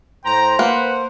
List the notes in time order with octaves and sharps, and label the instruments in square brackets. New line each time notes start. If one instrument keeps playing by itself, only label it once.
[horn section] A2 G5 A#5 [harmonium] C5
[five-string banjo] A#3 [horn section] B4 F#5